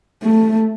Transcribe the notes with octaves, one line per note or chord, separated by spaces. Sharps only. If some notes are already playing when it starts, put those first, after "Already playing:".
A3